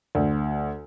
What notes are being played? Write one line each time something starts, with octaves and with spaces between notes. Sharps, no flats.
D2